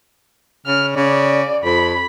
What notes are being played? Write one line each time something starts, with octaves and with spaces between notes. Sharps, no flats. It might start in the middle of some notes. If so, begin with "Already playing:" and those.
C#3 F6
C#3 D5
F2 B5